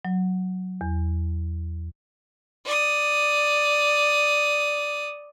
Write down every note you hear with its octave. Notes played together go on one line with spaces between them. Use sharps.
F#3
E2
D5 D#6